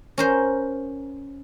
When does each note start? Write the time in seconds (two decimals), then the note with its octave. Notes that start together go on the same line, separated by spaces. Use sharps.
0.18 C#4 A#4 C5